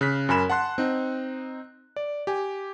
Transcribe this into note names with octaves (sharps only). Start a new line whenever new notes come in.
C#3 F#6 B6
F#2 A#4 G#5 B5 E7
F#5 A5 C6 F#6
C4 D#4
D5
G4 G#5